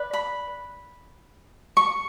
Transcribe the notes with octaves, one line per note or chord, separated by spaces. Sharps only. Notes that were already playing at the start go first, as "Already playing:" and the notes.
Already playing: B4 D5
B5
C#6